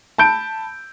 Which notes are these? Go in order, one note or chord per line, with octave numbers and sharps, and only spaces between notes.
A5 B5 G6 D7